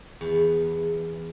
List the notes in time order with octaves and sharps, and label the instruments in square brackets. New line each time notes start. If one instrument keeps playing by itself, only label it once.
[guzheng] E2